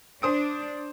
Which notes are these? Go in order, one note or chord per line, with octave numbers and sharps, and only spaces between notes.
D4 C5 D#6 D7